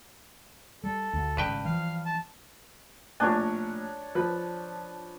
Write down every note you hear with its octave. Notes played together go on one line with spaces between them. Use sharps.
G3 A4
D2
G#1 G2 C#3 B4 G5
E3 F3 F5
A5
A#1 A2 D4 C#5 G#5
F3 B4